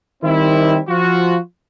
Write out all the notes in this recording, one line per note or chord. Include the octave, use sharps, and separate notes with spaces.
D#3 G3 C4 E4
F3 F4 F#4